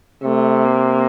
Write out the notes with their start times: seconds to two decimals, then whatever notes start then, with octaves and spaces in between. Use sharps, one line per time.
0.23 C3 A3
0.65 A#3